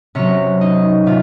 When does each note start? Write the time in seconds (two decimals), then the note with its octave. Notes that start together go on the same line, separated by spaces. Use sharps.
0.15 C3 F#3 C#4 C#5
0.61 D#4 D#5
1.06 C3 F4 F5